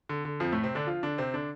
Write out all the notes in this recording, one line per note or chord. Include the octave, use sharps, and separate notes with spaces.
D3
D3
F2 F3
A2 A3
C3 C4
D3 D4
F3 F4
D3 D4
C3 C4
D3 D4